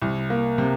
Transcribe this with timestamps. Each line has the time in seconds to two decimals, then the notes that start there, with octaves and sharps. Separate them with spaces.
0.02 C2
0.30 A#3
0.58 C3